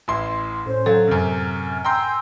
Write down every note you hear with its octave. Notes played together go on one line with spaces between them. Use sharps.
A1 E4 C6
A2 C#4 C5
F#3 A4 F5
F#2 C3 F6
G5 G#5 A#5 C6 E6 G6